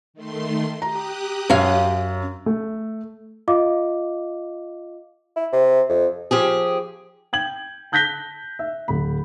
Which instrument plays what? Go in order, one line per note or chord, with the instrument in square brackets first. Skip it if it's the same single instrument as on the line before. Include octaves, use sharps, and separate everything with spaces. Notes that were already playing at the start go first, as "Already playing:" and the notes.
[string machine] D#3 A3 C6
[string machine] G4 D#6 F#6 [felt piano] A#5
[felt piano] F#2 [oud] C#5 F5
[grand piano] A3
[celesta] F4 D#5 F5 D6
[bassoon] E4
C3
F2
[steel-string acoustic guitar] F3 G4 G#4
[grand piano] G5 G#6 F#7
A5 F#6 G6 A#6 B6 G7
E5
D1 B5